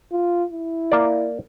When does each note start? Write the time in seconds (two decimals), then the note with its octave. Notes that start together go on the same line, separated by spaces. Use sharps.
0.12 F4
0.52 E4
0.92 A#3 D5